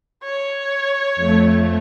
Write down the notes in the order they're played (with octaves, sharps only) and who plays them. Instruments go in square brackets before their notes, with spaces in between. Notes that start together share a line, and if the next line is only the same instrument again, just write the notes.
[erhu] C#5
[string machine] F2 A3